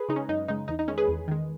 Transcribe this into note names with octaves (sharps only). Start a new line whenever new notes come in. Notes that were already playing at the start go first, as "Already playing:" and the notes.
Already playing: G#4 B4
C#3 G#3 D#4
C#4
F#2 D#4
C#3 G#3 D#4
E2 D#4
D#4
D#3 G#3 C#4
G#4 B4
E2
D#3 G#3